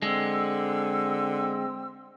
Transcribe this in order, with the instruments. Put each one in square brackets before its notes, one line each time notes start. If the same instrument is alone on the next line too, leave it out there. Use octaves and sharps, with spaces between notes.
[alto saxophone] D3 [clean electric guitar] G#3 [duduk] C4 [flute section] E6